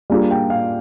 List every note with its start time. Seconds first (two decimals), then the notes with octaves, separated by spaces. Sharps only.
0.10 G3 A#3 D4 F4 G#4
0.31 G5
0.50 F5